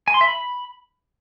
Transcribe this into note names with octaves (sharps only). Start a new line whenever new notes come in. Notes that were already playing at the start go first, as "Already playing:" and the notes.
G#5
C6
E5
B5